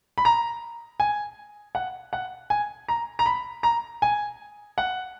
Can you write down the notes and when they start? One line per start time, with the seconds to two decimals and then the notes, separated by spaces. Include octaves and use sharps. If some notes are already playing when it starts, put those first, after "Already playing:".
0.18 B5
0.25 A#5
1.00 G#5
1.75 F#5
2.13 F#5
2.50 G#5
2.88 A#5
3.19 A#5
3.26 B5
3.63 A#5
4.02 G#5
4.78 F#5